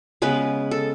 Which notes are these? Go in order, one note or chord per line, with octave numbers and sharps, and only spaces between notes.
C#3 G#3 B3 B4
A4